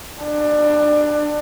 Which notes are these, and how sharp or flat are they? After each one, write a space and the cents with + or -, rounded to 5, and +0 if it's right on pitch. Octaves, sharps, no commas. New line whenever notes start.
D4 +20